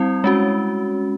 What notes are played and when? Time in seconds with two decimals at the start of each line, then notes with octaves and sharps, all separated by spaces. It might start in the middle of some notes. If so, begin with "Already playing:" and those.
Already playing: G3 C4 E4
0.24 G#3 C#4 F#4